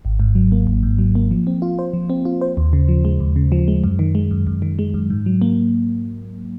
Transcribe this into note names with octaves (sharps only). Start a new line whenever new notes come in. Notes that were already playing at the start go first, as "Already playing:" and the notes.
G#1
G#2
F#3
A#3
G#1
G#2
F#3
A#3
F3
C4
F4
C5
F3
C4
F4
C5
D#2
C#3
F3
G#3
D#2
C#3
F3
G#3
F#2
D#3
G#3
F#2
F#2
D#3
G#3
F#2
G#2
F#3
A#3